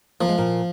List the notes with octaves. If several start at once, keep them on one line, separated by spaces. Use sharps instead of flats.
F3 A#3
G#3
A#2 A#3